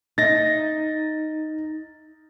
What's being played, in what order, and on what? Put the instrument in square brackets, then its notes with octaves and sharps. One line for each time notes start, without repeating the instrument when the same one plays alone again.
[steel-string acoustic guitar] D#4 [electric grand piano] A6 A#6